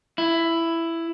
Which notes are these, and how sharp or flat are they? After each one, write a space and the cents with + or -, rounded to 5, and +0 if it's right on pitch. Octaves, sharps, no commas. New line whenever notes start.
E4 +10